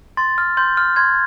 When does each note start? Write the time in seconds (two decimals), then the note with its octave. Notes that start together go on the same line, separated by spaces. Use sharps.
0.17 C6 A6
0.38 F6
0.57 C6 G6
0.77 F6
0.96 C6 G#6